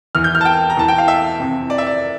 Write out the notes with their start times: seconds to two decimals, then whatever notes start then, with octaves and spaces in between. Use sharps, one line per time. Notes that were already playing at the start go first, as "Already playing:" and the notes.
0.15 E2 E3 F6
0.24 G6
0.35 F6
0.41 A5
0.45 G5
0.70 A#5
0.77 E2 E3 A5
0.88 G5
0.98 F5
1.08 E5
1.39 F2 C3 E3
1.70 D5
1.78 E5
1.87 D5